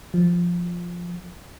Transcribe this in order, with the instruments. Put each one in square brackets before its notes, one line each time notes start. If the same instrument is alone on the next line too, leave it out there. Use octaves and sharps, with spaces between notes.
[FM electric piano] F3